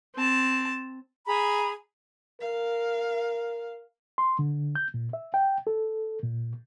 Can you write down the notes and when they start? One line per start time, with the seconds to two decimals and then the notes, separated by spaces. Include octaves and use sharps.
0.15 C4 A5
1.26 G#4 A#5 B5
2.41 A#4 F5
4.18 C6
4.39 D3
4.75 G6
4.94 A#2
5.13 E5
5.34 G5
5.67 A4
6.23 A#2